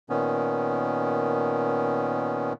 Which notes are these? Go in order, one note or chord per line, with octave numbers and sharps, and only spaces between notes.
A#2 D#3 B3 C#4